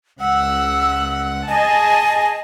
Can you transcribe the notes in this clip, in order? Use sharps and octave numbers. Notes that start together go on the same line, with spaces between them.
C#2 F#5 E6
G#4 D#5 G#5 A5